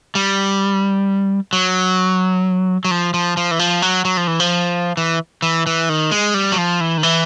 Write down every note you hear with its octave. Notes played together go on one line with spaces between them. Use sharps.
G3
F#3
F#3
F3
F3
F3
E3
F3
F#3
F#3
F3
E3
F3
E3
E3
E3
D#3
G#3
G3
F#3
F3
E3
D#3
E3